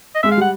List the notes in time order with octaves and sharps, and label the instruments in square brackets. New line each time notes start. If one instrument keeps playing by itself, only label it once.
[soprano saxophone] D#5
[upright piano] G#3 [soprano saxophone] E5
[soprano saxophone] F5
[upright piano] G3 [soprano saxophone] F#5